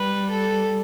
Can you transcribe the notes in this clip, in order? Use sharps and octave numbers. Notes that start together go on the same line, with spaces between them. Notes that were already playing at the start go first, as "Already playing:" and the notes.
Already playing: G3 B4
A4